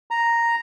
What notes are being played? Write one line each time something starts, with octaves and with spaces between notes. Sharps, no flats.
A#5